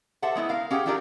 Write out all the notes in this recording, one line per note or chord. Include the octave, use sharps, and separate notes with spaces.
G4 A4 C5 E5 F#5
G#3 B3 E4
A#4 F5
C#4 G4 G#4 F#5 G5
F#3 D4 F4 G4 A#4 D5